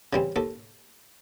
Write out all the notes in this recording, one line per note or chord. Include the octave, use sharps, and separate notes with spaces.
C#3 E3 G3 C4
D#2 A4